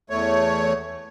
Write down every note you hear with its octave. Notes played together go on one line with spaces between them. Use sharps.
E2 A3 C#5